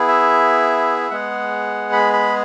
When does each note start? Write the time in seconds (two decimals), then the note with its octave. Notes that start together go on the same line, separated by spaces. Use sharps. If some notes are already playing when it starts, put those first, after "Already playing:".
Already playing: B3 E4 G#4
0.08 E5
1.11 G#3 B3 G#4 F#5
1.92 B5
2.13 B5